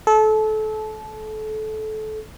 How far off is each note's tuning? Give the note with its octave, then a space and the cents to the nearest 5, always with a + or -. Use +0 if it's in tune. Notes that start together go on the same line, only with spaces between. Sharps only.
A4 -25